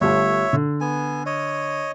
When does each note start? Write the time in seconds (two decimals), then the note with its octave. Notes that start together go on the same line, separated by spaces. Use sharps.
0.01 G1 G3 A3 C#5 E5
0.53 D3
0.81 B3 G#5
1.26 C#5 D#5